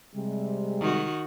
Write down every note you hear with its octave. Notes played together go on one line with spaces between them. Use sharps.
C3 G3 G#3
D#3 F#4